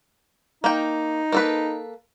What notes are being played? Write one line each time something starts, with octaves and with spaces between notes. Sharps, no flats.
A#3 D#4 G5
A#3 A4 B4